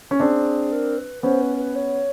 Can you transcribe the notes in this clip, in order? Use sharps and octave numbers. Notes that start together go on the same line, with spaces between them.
C#4
C4 D4 G#4
A#4
B4
B3 C#4 C5
B4
B4
C#5